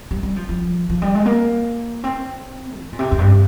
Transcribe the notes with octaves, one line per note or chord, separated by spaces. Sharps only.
G3
G3
F3
F3
F3
G3
G#3
A#3
C4
D#3
A#2
C3
F2
G2